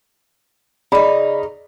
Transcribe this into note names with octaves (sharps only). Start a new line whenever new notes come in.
C#3 D#4 D5 B5